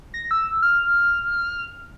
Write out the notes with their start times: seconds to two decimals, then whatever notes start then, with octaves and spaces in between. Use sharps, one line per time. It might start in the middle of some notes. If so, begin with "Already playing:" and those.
0.14 A#6
0.31 E6
0.62 F6